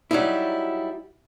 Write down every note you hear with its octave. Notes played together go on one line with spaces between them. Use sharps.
F#3 G3 D#4 E4